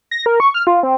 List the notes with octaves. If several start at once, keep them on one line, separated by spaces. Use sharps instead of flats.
A#6
A#4
C#6
F6
F4
C4